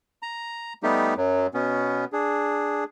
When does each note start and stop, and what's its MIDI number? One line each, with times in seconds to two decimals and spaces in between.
0.22 0.73 82
0.83 1.14 55
0.83 1.14 57
0.83 1.14 59
0.83 1.14 63
0.83 1.14 67
1.17 1.47 42
1.17 1.47 54
1.54 2.05 47
1.54 2.05 59
1.54 2.05 61
2.12 2.84 62
2.12 2.84 68